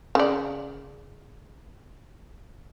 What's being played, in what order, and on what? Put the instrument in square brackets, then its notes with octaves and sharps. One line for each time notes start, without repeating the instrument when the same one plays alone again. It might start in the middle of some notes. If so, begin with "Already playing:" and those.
[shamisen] C#3 D5